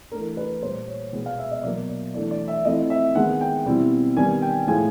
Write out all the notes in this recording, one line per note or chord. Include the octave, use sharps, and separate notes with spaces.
E3 A3 D4 A#4
B4
A#2 G3 A#3 C5
C#5
B2 G#3 B3
F5
E5
D#5
B2 F#3 A#3 D5
D5
E3 A3 D4 D5
D5
E5
F3 A3 C4 E4 D#5
E5
D#3 G#3 B3 F#5
G5
B2 G3 C4 E4
D#3 G3 B3 G#5
G5
A2 F3 G#3 G#5